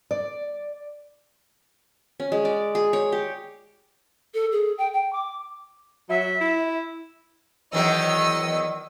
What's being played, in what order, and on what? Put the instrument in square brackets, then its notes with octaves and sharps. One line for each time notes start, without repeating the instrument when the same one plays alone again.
[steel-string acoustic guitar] D5
[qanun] C#4
G#3
D5
G#4
C#5
G4
[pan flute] A4
G#4
G5
G5
D6
[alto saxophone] F#3 [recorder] E5
[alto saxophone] E4
[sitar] E2 D#3 F#3 [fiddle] D#5 E6